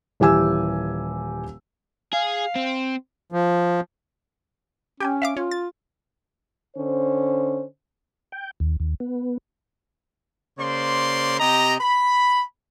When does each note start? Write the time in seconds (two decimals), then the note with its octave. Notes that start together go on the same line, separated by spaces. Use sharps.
0.20 D#1 E3 G4 G#5 E6
2.13 G#4 F5
2.56 C4
3.32 F3
5.00 C#4 G4 G5 G#5
5.22 E5 F5 D6
5.37 C#4 F4
5.51 A6
6.76 D3 C#4 C5
8.32 G5
8.60 D#2
8.80 D#2
9.00 B3
10.59 C#3 A#3 C5 D5 C6
11.39 C3 G4 D#5 A#5
11.80 B5